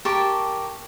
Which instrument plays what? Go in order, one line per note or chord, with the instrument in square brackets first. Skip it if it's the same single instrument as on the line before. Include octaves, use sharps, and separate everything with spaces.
[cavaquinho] G4 A#4 A5 C#6